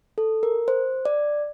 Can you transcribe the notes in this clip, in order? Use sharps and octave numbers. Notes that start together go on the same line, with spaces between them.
A4
A#4
C5
D5